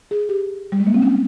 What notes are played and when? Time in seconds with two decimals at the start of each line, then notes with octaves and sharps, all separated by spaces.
0.11 G#4
0.29 G4
0.72 G3
0.80 G#3
0.87 A#3
0.94 C4
1.02 C#4